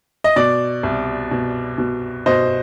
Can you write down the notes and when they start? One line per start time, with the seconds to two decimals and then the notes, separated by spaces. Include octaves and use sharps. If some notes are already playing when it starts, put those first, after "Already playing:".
0.24 D#5
0.36 B2 D5
0.83 C2
1.31 B2
1.78 B2
2.26 B2 C5 D#5